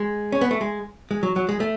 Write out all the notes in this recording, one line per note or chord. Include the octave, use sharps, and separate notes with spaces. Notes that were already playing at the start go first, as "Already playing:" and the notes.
Already playing: G#3
C#4
B3
A3
G#3
G#3
F#3
F#3
G#3
A3